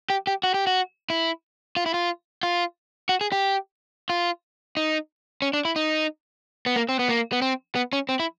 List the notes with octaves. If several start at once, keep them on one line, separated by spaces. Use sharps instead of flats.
G4
G4
F#4
G4
F#4
E4
F4
E4
F4
F4
F#4
G#4
G4
F4
D#4
C#4
D4
E4
D#4
B3
A#3
C4
B3
A#3
B3
C4
B3
C#4
C4
E4